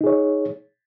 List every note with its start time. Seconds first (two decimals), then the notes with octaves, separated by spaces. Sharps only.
0.01 D#4
0.04 G#4
0.07 C#5